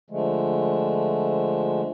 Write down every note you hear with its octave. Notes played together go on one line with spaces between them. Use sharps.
D3 F3 G#3 A3